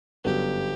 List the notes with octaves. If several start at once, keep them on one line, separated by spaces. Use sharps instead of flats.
G1 F#2 D3 F#3 B3 G4